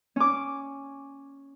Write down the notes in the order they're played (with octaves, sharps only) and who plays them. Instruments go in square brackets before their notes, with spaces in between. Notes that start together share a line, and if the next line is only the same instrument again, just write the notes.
[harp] C#4 D6